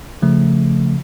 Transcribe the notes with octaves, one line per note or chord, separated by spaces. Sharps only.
C#3 F3 A3